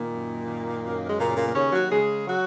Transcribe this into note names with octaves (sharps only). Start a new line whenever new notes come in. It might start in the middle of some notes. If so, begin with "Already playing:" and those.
Already playing: A#2 D#3 A#3
F#2
D#3
F#2
G#3
A#2 C#3 A#3
A#2 A#3
A#3
D#2 C#3 C#4
F#3 F#4
C#3 G#3 G#4
F#3 F#4